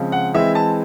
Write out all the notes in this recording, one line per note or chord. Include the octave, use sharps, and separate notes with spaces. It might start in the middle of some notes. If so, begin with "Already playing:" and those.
Already playing: C#3 F3 G#3 C4
F#5
E3 G#3 C4 E5
A5